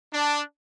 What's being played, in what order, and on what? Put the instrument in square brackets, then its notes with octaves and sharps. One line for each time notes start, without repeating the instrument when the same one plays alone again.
[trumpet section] D4